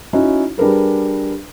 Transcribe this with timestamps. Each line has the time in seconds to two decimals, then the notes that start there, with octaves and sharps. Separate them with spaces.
0.13 C#4 D#4 E4 F#4
0.58 G3 D4 G#4 A#4 B4